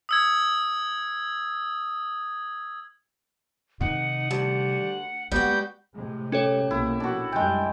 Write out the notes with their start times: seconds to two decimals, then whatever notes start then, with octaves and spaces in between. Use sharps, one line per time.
0.09 D#6 E6 G#6
3.81 C3 D#3 D#4 F#5
4.31 D2 G3
5.32 G3 G#3 A#3 B3 F#4 G6
5.94 A2 C3 G#3
6.32 C#4 G4 A4 C#5
6.71 C2 B2 A#3 E4
7.00 A#1 D4 F#4
7.32 F#2 G3 G#3 G5